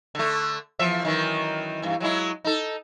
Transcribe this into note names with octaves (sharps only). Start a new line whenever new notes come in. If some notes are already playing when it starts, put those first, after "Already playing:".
D3 A3
E2 F3 E5
F#2 D#3 E3
E2 G2
F#3 G#3 E4
D#4 A4